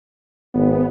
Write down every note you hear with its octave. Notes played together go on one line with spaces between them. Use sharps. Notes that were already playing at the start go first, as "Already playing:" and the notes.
G#1 B3